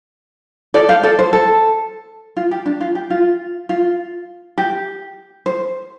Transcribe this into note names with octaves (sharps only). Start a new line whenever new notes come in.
A4 D5
C5 F5
A4 D5
C5
A4
F4
G4
D4
F4
G4
F4
F4
G4
C5